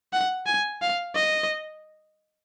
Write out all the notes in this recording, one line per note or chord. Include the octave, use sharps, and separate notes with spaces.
F#5
G#5
F5
D#5